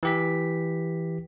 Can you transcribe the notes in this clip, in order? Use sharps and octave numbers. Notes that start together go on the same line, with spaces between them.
E3 G4 B6